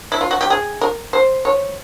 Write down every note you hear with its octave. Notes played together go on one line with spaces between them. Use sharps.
E4
F4
F#4
G4
G#4
A#4
C5
C#5